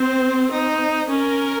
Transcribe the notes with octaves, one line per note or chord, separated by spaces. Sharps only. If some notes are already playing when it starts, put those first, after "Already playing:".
Already playing: C4 C5
D#4
C#4 A#4